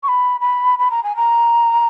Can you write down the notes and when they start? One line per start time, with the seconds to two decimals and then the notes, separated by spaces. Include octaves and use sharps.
0.03 C#6
0.08 B5
0.41 B5
0.79 B5
0.91 A#5
1.04 G#5
1.16 A#5